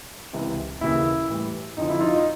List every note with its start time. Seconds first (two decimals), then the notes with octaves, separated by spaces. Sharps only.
0.33 C#2 C3 E3
0.81 D#2 C#3 E3 E4
1.29 A2 E3 G3
1.77 F2 D3 F3 D#4
1.89 E4
2.01 D#4 F4
2.14 D#4